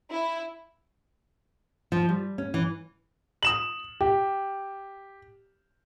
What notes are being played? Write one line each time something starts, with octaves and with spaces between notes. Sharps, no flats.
E4
F3
G3
C#4
E3
D#6 E7 F#7
G4